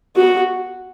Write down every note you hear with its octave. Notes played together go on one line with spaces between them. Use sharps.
F#4